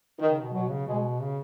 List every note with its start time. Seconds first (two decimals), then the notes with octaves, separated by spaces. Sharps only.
0.19 D#3
0.30 C#3
0.41 B2
0.53 B2 F#3
0.70 C#3
0.87 B2 G#3
1.21 C#3